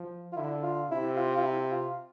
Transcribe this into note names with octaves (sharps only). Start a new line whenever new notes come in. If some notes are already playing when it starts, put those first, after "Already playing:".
Already playing: F3
F4
D3 E4
F4
C3 E4
F4
F4
E4
F4